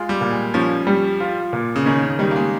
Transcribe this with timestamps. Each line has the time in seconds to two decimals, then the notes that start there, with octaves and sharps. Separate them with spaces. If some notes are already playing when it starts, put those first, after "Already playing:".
Already playing: G#3 F4
0.09 G3
0.21 A#2
0.31 G#3
0.54 F3 C#4
0.87 G3
1.20 F4
1.53 A#2
1.76 C#3
1.86 D#3 C#4
2.03 C#3
2.19 D#3 G3
2.31 A#3
2.36 G#3